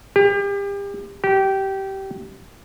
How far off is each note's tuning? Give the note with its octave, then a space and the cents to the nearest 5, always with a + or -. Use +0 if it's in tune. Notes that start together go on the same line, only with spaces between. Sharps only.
G4 +35
G4 -20